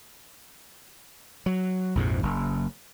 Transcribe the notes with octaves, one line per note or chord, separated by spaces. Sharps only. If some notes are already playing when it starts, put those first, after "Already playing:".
F#3
A#1 F2 G#2 C3
F#1